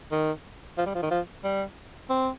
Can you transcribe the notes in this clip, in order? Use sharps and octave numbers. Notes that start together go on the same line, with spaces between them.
D#3
F3
G3
F3
D#3
F3
G3
C4